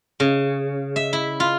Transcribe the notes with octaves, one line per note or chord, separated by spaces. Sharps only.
C#3
E5
E4
F4